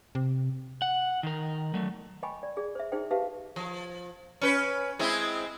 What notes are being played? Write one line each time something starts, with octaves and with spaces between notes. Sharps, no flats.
C3
F#5
D#3 A#4
F#3 A3
D#5 G5 G#5 B5 C#6
D5
G#4 D5
C5 E5
D#4 E4 G#4 C5 G5
G4 B4 E5 F5 A5
F3
C#4 B4
G#3 C4 E4